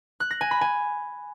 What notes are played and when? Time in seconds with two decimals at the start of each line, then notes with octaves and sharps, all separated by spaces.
0.20 F#6
0.31 A#6
0.41 G#5
0.51 B5
0.61 G#5